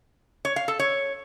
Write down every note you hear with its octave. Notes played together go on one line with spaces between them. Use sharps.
C#5
F5
A4
C#5